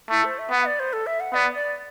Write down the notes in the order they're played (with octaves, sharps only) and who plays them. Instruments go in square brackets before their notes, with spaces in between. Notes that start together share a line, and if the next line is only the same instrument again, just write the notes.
[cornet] A3 [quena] E4
[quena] C5
E5
[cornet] B3 [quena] F#5
[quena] D5
C5
A4
E5
F#5
[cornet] B3 [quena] D5
[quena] D5